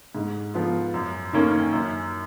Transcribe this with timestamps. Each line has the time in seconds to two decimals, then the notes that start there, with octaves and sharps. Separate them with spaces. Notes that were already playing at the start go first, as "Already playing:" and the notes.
0.15 G#2
0.54 F3 B3 F4
0.94 F#2
1.33 D#3 A#3 C#4
1.73 F#2